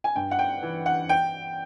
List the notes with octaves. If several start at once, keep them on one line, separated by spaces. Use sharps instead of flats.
G#5
G2 G5
F#5
G5
E3
F#5
G5